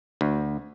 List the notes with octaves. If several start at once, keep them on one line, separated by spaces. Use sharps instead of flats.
D2